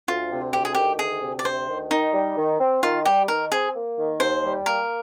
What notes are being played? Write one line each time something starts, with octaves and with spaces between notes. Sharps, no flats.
D2 F4
C3
D2 G4
G#4
D#3 G4
D2 G#4
C3
D5
D2 C5
D#3
D#3 D#4
G3
D#3
C4
D#3 F4
G3 G4
D#3 A#4
C4 G#4
A#3
D#3
D#2 C5
G3
A#3 A#4